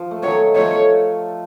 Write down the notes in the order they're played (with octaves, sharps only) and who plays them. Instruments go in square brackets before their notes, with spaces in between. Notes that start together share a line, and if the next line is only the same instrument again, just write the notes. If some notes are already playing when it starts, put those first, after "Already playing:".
Already playing: [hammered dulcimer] F3
A3
[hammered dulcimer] D#3 F#3 [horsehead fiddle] C#5
[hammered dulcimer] F3 A3 [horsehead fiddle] C#5